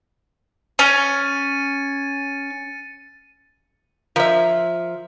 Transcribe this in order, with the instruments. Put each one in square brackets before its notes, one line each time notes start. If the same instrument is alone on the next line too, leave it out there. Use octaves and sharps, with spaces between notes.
[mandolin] C#4 [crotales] A6 C#7 D#7
[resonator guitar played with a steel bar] F3 [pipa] A#4 E5